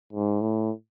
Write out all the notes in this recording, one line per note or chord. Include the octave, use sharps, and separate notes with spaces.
G#2
A2